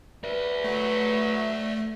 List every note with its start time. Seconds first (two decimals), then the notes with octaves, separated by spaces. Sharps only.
0.24 B4 D5 E5
0.64 F#3 A3